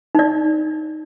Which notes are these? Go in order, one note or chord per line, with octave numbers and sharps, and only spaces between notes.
D#4 D5